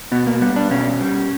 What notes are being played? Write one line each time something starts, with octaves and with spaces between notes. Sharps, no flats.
B2 B3
A#3
G3 B3
D4
B2 C#4
G3